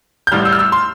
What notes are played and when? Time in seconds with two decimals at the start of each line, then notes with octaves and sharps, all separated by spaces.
0.27 G6
0.32 A1 A2 G3 F6
0.45 E6
0.52 F6
0.59 E6
0.72 C6